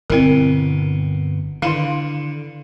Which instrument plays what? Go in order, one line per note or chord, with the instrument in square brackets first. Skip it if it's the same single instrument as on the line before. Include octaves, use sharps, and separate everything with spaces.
[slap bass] G1 B2 [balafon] C4 E4 A#4
[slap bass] D3 [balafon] D#3 E4 F5